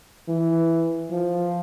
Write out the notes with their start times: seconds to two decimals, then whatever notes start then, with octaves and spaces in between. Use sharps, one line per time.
0.28 E3
1.11 F3